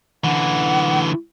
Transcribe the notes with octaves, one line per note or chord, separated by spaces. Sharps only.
D3 E3 F#5